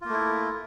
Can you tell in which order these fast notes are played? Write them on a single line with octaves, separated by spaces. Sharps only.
F4 A#3 A3 E4